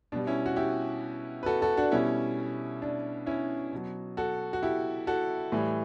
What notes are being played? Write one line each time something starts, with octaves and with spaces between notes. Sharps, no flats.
B2 G3 D4
C#4 E4
F#4
E4 G4
B4
F#4 A4
F#4 A4
D4 F#4
B2 G3 C#4 E4
D4
C#4 E4
B2 F#3
F#4 A4
F#4
E4 G4
F#4 A4
A2 E3 G3